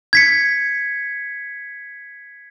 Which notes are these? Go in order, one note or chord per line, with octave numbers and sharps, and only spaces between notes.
G#6 B6 C#7